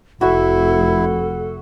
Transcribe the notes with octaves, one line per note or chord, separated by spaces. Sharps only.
F1 E4 F#4 A4 E5